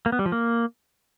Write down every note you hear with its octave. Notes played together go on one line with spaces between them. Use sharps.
A#3
B3
G3
F3
A#3